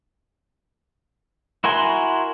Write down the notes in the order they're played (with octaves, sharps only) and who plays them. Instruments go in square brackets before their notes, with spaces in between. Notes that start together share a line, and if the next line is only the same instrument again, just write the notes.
[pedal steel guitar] E4 F#4 A#4 G#5 C6